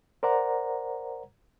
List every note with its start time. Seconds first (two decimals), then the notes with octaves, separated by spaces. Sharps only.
0.23 A#4 C5 D5 F#5 A#5